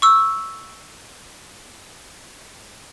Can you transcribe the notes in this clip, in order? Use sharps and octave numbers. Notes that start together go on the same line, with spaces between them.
C#6 E6